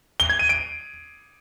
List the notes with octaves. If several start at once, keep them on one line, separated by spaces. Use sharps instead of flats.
G7
G#6
D#7
D7